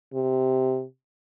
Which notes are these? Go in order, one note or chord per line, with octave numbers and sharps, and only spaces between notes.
C3